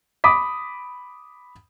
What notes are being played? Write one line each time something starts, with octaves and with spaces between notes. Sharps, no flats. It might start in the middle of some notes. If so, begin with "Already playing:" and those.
B5 D6 D#6 B6